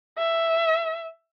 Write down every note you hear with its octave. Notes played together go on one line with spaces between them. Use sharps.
E5